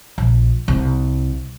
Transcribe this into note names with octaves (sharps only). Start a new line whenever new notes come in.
A#1
C2